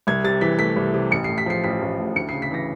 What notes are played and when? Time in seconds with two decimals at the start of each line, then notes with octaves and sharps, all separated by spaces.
0.07 C2 G#6
0.24 C3 A6
0.41 E3 B6
0.59 A3 B6
0.76 C2
0.94 C3
1.11 A1 C#7
1.24 A2 C7
1.38 B6
1.46 F3 C7
1.64 A1 B6
1.81 A1
1.99 A2
2.15 D2 C#7
2.29 C#3 C7
2.42 B6
2.51 E3 A#6